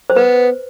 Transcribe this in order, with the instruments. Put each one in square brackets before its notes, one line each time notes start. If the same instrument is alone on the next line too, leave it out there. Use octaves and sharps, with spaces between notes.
[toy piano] C5
[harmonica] B3 [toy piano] B4